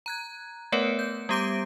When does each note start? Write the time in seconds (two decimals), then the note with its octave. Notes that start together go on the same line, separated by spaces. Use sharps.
0.06 A#5 F#6 G#6
0.72 A3 B3 A#4 B4 C#5 F#5
0.99 G6
1.29 G3 B3 G4 D6 G6 D7